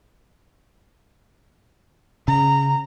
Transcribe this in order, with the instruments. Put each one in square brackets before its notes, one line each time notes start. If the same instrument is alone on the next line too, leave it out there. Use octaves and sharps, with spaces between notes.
[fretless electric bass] C#3 [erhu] A#5